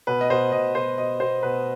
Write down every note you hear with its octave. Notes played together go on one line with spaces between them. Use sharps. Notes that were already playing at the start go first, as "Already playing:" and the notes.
B2 B4
D#5
B2 C5
B2 D#5
B2 C5
B2 D#5
B2 C5
B2 B4